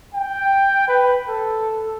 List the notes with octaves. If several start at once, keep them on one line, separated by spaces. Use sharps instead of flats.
G5
B4
A4